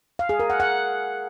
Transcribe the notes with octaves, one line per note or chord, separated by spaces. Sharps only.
F5
G#4
A#4
F#5
F#5